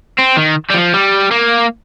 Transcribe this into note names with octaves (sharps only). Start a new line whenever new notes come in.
C4
D#3
G3
F3
G3
A#3